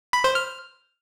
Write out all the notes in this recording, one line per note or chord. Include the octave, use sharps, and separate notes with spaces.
B5
C5
F6